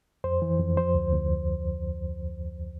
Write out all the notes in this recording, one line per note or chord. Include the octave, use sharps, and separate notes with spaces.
F2 C5
E3
F2
F3 C5
D2
D2